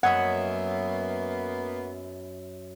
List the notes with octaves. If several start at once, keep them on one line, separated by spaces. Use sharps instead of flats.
F#2 A#3 B3 C#5 D#5 E5 F#5